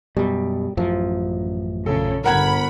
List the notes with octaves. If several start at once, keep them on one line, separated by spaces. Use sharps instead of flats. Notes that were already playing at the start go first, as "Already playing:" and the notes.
F#2 B2 G3
A1 F#2 F3
A#1 C#3 A4
G1 A#4 F#5 B5 G#6